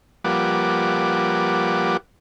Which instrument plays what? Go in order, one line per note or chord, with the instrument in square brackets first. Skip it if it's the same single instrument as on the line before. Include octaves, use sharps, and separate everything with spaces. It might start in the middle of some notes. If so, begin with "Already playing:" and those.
[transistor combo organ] F3 G3 A#3 B4 F#5 D6